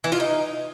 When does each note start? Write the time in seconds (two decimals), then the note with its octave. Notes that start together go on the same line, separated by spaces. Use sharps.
0.04 E3
0.12 F4
0.20 D#4